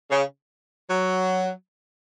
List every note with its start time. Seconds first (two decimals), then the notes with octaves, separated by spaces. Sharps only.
0.10 C#3
0.90 F#3